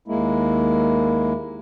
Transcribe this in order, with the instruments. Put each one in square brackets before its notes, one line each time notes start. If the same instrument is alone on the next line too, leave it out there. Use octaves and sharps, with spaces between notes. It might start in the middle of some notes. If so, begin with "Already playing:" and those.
[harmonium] D#2 G#3 A#3 E4